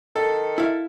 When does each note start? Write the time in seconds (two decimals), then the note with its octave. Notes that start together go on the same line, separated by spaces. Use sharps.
0.16 D#3 A4
0.58 E4 F5